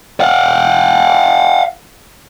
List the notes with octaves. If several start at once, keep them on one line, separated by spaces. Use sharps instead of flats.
F5 F#5